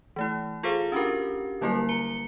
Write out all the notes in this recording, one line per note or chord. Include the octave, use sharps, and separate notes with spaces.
E3 A3 E4
F4 G#4 A4 C5 F5
C#4 D4 F#4 G4 A#4
D3 F#3 G3 A#3 E4 A#4
A#5 C#7 G7